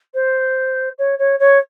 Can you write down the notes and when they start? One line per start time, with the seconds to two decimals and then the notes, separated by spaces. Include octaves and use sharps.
0.14 C5
0.98 C#5
1.19 C#5
1.40 C#5